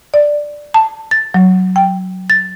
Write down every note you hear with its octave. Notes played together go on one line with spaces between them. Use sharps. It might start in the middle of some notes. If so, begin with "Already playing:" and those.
D5
A5
A6
F#3
G5
A6